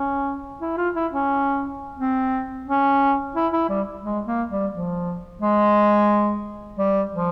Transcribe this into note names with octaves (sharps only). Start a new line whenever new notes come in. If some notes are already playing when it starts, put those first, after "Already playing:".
Already playing: C#4
E4
F4
E4
C#4
C4
C#4
E4
E4
G3
G#3
A#3
G3
F3
G#3
G3
F3